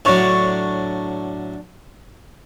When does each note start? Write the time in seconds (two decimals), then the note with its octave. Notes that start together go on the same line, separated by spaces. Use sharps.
0.05 A2 D3 F#3 D4 C#5